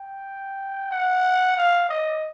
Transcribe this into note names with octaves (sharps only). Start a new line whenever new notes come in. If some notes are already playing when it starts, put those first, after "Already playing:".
Already playing: G5
F#5
F5
D#5